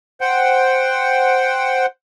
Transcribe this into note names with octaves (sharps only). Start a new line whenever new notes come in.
C5 F#5 G5